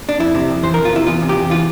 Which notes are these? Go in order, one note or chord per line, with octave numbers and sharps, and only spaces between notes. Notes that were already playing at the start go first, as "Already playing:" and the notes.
D4
F2 E4
C3
F2
E3 C5
F2 A#4
F4
C3 E4
E2 F4
C3
G4
E2
E3 F4